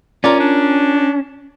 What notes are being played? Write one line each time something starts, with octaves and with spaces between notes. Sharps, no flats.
C#4 F4 A#4 D5
D4